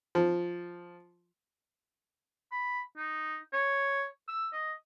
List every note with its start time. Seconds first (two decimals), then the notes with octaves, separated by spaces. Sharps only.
0.15 F3
2.52 B5
2.98 D#4
3.53 C#5
4.28 E6
4.53 D#5